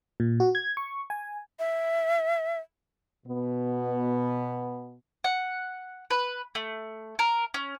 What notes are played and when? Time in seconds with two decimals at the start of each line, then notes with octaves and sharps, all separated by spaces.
0.20 A#2
0.40 F#4
0.55 G#6
0.77 C#6
1.10 G#5
1.59 E5
3.26 B2 B3
5.24 F#5
6.10 B4
6.55 A3
7.19 A#4
7.54 C#4